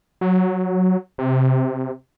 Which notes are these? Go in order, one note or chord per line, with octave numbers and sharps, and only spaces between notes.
F#3
C3